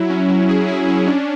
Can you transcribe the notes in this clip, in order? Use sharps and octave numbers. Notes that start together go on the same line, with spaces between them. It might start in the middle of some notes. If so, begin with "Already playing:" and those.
Already playing: F#3 E4
C#4
F#3
G#4
E4
C#4
D4